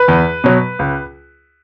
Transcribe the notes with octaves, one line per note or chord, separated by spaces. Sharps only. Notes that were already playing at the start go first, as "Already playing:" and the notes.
Already playing: B4
E2
B2 F#3
C#2